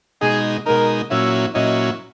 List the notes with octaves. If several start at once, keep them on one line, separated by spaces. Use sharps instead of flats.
B2 G#3 D#4 G#4
B2 G#3 D#4 A#4
A#2 F#3 C#4 E4 E5
A#2 F#3 C#4 E4 D#5